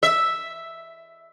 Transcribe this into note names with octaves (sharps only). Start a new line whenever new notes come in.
E5